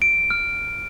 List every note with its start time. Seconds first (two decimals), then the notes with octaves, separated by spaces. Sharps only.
0.02 D7
0.30 F6